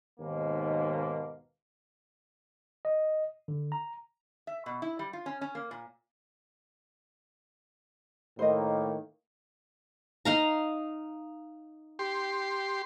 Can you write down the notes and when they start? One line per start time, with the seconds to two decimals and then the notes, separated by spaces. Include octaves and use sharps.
0.20 D#2 G#2 B2 A#3
2.85 D#5
3.48 D3
3.72 A#5
4.47 E5
4.66 B2
4.82 E4
4.99 G3
5.13 F4
5.26 C#4
5.41 C#4
5.55 A#3
5.71 A#2
8.39 A2 D#3 A#3 C5 D#5
10.25 D#4 F5 A#5
11.99 G4 C6